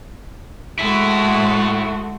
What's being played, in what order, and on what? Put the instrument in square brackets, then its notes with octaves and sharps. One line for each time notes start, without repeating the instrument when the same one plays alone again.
[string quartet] G#3 A3 F#4 [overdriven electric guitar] E4 A4